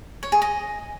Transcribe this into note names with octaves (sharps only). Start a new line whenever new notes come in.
C#5
G#4
D#5